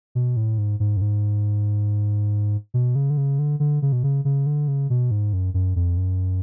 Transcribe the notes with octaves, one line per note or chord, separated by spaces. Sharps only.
B2
A2
G#2
G#2
F#2
G#2
B2
C#3
D3
C#3
D3
D3
C#3
B2
C#3
C#3
D3
C#3
B2
G#2
F#2
F#2
F2
F#2